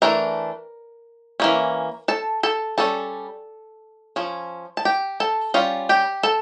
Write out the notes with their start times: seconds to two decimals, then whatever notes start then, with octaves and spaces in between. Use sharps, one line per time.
0.02 E3 A3 D4 A#4 A#5
1.40 E3 A#3 C#4
2.08 A4 A5
2.43 A4 A5
2.78 G3 C#4 A4 A5
4.16 F3 C#4
4.77 A5
4.85 G4 G5
5.20 A4 A5
5.54 G3 C#4 F4 F5
5.89 G4 G5
6.23 A4 A5